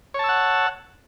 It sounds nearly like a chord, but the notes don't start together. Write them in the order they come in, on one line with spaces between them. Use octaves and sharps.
C#5 A5 E6 F#5